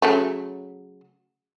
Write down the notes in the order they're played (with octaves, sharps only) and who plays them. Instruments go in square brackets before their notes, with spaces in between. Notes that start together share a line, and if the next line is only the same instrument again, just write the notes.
[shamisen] C#3 F#3 A3